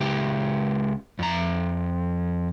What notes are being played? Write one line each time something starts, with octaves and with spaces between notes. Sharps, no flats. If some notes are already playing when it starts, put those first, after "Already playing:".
C#2 G4
F2 A#5